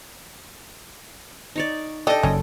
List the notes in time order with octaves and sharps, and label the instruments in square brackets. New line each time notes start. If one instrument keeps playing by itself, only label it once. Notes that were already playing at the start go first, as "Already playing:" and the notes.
[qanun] D#4 C#5 D5
[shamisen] D4 G4 [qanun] A4 G5 [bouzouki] D#5
[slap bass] F#1 [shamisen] C#4